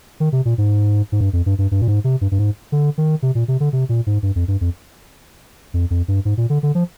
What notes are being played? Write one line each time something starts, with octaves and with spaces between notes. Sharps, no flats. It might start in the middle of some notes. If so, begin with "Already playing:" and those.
D#3
C3
A#2
G#2
G#2
G2
F2
G2
G2
G2
A#2
G#2
C3
G2
G2
G#2
D3
D#3
C3
A#2
C3
D3
C3
A#2
G#2
G2
F2
G2
F2
F2
F2
G2
G#2
A#2
D3
D3
F3